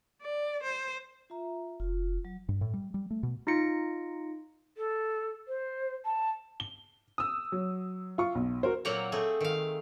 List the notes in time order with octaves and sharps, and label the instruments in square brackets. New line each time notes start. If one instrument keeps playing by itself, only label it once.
[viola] D5
C5
[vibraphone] F4 E5 A#5
[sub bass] F1 [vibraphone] F4
[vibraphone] F#3
[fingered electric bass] G2
A2
G3
G3
A3
B2
[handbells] D#4 F4 A#6 C#7 D7
[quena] A4
C5
A5
[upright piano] G7
D#6 E6
F#3
F4 C#6
B1
F#4 A#4 C5
[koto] A#2 F#3 A#3 C4 F#5 A#5
A3 C4 G#4
D#3 F5